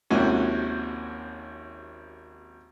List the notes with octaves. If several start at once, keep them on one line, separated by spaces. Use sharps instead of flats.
G#1 D#2 C3 F3 C#4 F#4